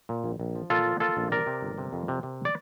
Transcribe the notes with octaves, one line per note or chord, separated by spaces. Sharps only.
A#2
A#1
A#1
F3
A#2 F4 A4
F3
A#3 F4 A4
A#1
C3 A#4 D5
C3
G1
C3
F2
C3
C3
D5